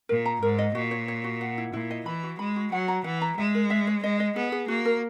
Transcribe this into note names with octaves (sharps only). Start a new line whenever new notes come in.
A#2 A#4
A#5
G#2 A#4
D#5
A#2 F#4
C#5
C#5
F#4
F#5
E4
A#2 E4
D#5
E3 B5
F#4
G#3 B5
F#4
F#3 F#5
A#5
E3 F#5
A#5
G#3 E5
A#4
E5
C#5
G#3 D#5
D#5
B3 G#4
G#4
A#3 F#4
A#4